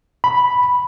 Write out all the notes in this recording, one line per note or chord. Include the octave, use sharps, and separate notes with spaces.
B5